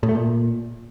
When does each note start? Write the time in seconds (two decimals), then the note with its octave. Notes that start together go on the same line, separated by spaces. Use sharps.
0.03 A2
0.09 A3
0.15 A#2